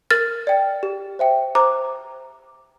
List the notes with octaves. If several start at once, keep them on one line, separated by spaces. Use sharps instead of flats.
A#4 F6 A6
D5 G5
G4
C5 E5 G5
C5 A#5 D6